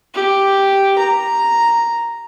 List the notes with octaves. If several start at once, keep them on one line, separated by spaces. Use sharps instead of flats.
G4
A#5